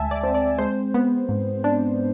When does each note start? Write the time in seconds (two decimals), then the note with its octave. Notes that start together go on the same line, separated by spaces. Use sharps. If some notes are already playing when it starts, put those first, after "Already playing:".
Already playing: D2 G#3 E5 G#5 A5
0.11 D5
0.23 C4
0.34 D5
0.58 G#3 C5
0.94 B3
1.29 G#2
1.64 D4